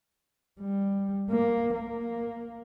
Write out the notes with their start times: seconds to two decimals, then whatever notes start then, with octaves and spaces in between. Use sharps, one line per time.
0.60 G3
1.31 A#3
1.74 A#3